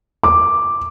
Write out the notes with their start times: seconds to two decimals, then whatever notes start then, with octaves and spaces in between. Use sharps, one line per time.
0.23 D6